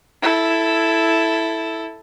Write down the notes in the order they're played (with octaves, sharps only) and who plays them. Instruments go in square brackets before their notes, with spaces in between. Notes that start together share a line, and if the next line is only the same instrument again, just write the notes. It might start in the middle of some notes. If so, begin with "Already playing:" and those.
[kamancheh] E4 A4